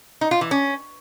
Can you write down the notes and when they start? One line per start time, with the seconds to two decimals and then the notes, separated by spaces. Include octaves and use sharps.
0.21 D#4
0.31 F4
0.41 E3
0.51 C#4